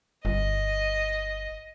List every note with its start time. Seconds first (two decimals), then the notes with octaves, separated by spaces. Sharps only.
0.25 G1 D#5